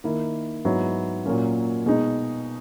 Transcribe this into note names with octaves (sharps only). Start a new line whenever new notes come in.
D#3 A#3 E4
G#2 F#3 B3 E4
A#2 F#3 A#3 C#4
B2 G#3 D#4